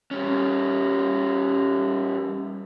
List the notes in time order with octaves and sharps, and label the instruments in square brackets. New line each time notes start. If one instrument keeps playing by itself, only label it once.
[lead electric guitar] G3 C#4